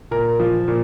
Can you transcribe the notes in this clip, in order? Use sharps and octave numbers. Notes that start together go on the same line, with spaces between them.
A#2 A#4
F3
A#2